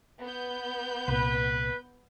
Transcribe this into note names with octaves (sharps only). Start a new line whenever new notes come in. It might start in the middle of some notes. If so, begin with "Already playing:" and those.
B3 G6
C2 A#2 B4